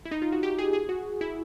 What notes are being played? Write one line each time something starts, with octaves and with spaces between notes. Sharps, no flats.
E4
D#4
F4
F#4
G4
G#4
G#4
F#4
E4